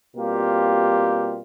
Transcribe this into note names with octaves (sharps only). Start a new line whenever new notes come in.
B2 G3 A#3 C4 F4 G4